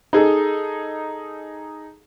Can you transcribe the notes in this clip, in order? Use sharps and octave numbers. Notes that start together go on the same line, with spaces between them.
D#4 G#4 A4